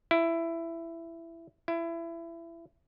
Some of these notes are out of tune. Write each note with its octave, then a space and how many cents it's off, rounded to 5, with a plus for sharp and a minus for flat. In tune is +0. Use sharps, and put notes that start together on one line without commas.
E4 +15
E4 +25